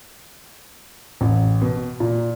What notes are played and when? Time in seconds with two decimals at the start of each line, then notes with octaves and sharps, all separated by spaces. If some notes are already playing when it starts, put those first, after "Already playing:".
1.21 A1
1.61 B2
2.00 A#2